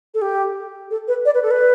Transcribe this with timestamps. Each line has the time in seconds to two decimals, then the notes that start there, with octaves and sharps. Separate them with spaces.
0.14 A4
0.22 G4
0.91 A4
1.08 B4
1.25 D5
1.35 B4
1.43 A4
1.51 B4